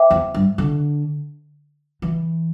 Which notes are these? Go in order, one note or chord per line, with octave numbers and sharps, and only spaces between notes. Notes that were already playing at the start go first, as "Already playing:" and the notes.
Already playing: C5 E5 G5 D6
E2
G2
D3
E3